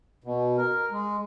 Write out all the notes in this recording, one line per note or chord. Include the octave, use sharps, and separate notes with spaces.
B2
A#4
G#3